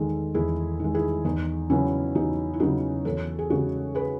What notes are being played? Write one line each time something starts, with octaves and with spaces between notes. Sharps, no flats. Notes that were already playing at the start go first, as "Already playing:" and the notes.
Already playing: E2 D#3 G#3 A4
E2 E4 G#4
D#3 G#3
E4 G#4
E2 D#4
C#3 F#3 B3 C#4 E4
E2 D#4 F#4
E4
C#3 F#3 B3 D#4 F#4
E2 A4 C#5
G#4
C#3 G#3 F#4 A4
G#4 B4